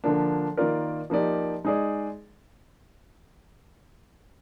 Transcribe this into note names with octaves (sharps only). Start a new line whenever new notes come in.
D3 F3 A#3 D4
D#3 A#3 F4 A#4 D5
F3 A#3 D#4 G4 D5
G#3 D#4 G#4 D5